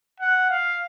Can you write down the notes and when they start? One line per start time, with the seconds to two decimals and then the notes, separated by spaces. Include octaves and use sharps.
0.20 F#5
0.50 F5